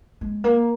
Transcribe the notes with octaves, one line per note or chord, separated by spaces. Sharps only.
G#3
A#3